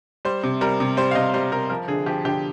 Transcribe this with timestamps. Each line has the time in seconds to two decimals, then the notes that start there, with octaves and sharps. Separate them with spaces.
0.25 G3 C5
0.43 C3
0.61 G3 A#4
0.80 C3
0.97 G3 C5
1.11 F5
1.15 C3 D#5
1.34 G3 C5
1.52 C3 A#4
1.70 F3 A#4
1.88 D3 G#4
2.06 F3 G4
2.25 D3 G4